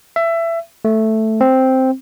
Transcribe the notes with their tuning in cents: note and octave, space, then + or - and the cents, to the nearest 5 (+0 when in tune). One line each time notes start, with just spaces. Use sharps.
E5 +20
A3 +0
C4 +0